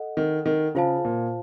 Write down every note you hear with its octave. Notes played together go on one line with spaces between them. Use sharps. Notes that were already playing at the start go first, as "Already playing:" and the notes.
Already playing: A4 D#5 F#5
D#3
D#3
C#3 F4 C5 F5 A5
A#2